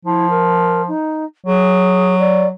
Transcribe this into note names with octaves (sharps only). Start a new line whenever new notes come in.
F3 E4
A#4
D#4
F#3 G#4
D5